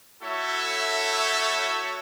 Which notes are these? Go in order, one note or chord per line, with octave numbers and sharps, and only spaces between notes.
A3 E4 F#4 A4 C#5 E5